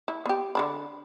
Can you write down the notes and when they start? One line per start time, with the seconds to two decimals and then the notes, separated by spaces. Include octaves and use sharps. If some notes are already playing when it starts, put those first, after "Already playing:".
0.08 E4
0.26 B3 G4
0.55 D3 D4 B5